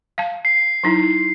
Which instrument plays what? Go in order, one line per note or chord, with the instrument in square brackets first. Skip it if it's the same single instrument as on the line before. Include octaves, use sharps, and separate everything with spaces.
[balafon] F5 A5
[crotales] C7
[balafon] F#3 D#4 E4